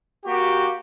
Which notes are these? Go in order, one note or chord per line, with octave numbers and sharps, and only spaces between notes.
A#3 F#4 G4